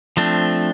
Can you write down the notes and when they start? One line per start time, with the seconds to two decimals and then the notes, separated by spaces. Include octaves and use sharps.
0.17 F3 A3 C4 D4